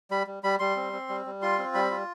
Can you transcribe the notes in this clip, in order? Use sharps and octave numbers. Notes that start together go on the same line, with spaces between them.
G3 B5
G3
G3 B5
G3 C6
C4
C4
G3
G3
F4 C6
C4
G3 B5
F4